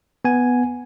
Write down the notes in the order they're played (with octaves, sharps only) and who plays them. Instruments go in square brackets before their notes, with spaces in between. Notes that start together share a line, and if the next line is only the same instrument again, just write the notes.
[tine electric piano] B3 G#5